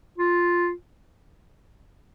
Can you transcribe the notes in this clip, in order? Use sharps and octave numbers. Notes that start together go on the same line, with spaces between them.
F4